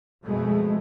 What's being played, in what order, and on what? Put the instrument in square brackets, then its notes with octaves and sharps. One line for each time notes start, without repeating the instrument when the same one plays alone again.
[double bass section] F2 B2 G#3 A3